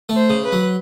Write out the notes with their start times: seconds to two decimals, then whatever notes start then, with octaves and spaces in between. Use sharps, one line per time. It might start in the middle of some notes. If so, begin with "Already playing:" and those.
0.09 A3
0.16 C5
0.30 C#3
0.45 B4
0.52 F#3